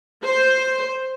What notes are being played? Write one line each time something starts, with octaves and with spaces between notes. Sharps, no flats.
C5